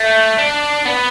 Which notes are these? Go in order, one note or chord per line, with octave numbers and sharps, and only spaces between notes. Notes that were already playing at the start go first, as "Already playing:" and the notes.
Already playing: A3
D4
B3